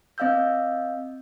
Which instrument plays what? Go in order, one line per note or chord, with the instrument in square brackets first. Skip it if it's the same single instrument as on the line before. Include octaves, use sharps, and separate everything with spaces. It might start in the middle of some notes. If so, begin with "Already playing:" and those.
[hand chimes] C4 D#5 F5 E6 G6